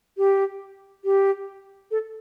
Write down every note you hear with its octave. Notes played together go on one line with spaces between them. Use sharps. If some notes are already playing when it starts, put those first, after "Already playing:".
G4
G4
A4